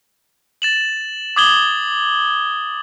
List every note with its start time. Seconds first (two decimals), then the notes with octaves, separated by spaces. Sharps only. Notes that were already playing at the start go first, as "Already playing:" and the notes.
0.62 A6 E7 F#7
1.36 D6 D#6 G#6 F#7 G7